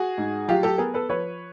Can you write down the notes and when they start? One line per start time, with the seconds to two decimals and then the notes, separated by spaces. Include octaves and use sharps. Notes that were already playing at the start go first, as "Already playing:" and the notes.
Already playing: F#4 G#4
0.18 G#2
0.48 F#3 F4 G4
0.63 G4 A4
0.78 B3 G#4 A#4
0.94 A4 B4
1.09 F3 B4 C#5